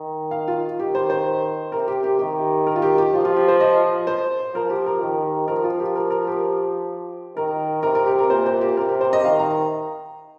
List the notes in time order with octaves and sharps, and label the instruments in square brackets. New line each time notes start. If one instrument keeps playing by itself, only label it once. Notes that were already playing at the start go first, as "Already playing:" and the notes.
Already playing: [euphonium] D#3
[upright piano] F5
F4
[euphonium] D#3 [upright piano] G4
[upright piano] C5
C5
[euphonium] C3 [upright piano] A#4
[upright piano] G4
G4
[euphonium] D#3 [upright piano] G4
[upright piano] A#4
F4
G4
G4
[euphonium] F3 [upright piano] F4
[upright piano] F4
G4
C5
D#5
C5
[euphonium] F3 [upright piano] A#4
[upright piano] G4
A#4
[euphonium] D#3 [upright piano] G4
[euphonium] F3 [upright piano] A#4
[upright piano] F4
G4
A#4
A#4
G4
[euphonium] D#3 [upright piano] A#4
[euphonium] C3 [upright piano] A#4
[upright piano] A#4
G4
A#4
[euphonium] A#2 [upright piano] C5
[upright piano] C5
G4
[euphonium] C3 [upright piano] A#4
[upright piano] G4
C5
D#5
[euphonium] D#3 [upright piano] F5
[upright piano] A#5